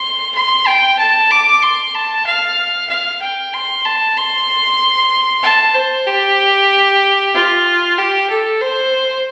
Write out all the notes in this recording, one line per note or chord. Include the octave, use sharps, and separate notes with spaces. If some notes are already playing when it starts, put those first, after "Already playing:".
Already playing: C6
C6
G5
A5
D6
C6
A5
F5
F5
G5
C6
A5
C6
A5
C5
G4
F4
G4
A4
C5